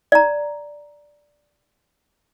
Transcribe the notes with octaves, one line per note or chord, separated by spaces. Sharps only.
D5 A#5